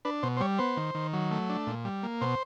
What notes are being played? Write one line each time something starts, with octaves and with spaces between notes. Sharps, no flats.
D4 B4
B2 C5
C5
G3 C#5
B3 C5
D#3
D#3
F#3
A3
D4
A#2
G3
A#3
B2 C5